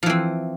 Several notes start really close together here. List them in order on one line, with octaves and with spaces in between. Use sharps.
F3 E3 C4